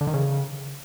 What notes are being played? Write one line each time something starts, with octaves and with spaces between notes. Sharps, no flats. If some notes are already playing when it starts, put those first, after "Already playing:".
D3
D#3
C#3